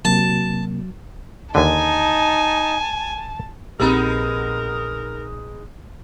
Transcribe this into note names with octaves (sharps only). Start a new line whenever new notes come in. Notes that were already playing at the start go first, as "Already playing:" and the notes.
C3 F#3 A#3 A5
D#2 D3 D#4 G#5 A5
A#1 G#3 B3 C4 D#4 G4 A#4